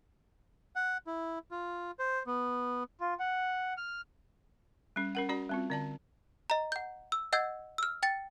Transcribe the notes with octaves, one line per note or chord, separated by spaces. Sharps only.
F#5
E4
F4
C5
B3
F4
F#5
F6
G3 C#4
C#4 A#4 F#5
C#4 F#4 D5 A#5
G3 C4 F4
D3 D5 A5
D#5 A#5
F#5 G6
E6
D#5 F#5 E6 G6 G#6
E6 F6
G5 A6 C#7